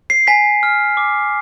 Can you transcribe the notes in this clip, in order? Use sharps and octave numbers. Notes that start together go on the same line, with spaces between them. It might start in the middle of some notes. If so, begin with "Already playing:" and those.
C7
G#5 B6
F6
D6